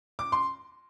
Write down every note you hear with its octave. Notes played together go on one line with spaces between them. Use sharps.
D6
C6